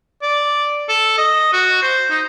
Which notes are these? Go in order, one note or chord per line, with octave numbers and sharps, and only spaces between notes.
D5
A4
D#5
F#4
C5
D#4